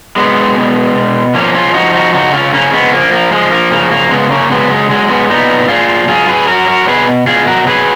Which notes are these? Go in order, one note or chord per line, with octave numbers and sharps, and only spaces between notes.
F#3 G#3 B3
B2
B2
F3 A#3 C#4
C#4 F4
F3 D#4 F#4
D#4 F#4
C#3 D#4 F#4
C#4 F4
C#3 A#3 C#4
G#3 B3
F3 A#3
A#3
F3 G#3
A#3
C#3 A#3
A#3
C#3 G#3 B3
A#3 C#4
F#3 G#3 B3
G#3
F#3 G#3
G#3 B3
A#2 B3 D#4
A#2 F4 G#4
F#3 F4 G#4
G#4 B4
F#3 F#4 A#4
F#4 A#4
B2 G#4 B4
B2 F4 G#4
F#4 A#4
F#3 G#4 B4